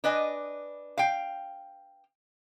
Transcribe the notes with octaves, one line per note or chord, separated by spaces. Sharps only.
D4 B4 D#5 G#5
F5 G5